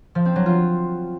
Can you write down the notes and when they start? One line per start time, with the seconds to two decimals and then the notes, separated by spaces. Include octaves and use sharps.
0.15 F3
0.25 C4
0.36 F#3
0.46 F4